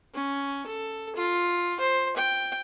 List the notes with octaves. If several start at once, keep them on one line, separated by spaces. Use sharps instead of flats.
C#4
A4
F4
C5
G5